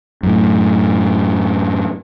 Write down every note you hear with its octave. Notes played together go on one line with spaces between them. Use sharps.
F#2 A2